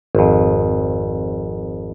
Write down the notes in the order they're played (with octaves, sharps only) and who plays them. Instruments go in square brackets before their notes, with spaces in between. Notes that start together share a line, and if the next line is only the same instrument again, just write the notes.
[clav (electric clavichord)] G#1 F2